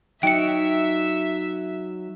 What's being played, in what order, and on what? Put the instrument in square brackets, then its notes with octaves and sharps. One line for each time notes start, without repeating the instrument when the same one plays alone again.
[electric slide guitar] F#3 [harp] D#4 [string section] E5 [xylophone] G5 C#7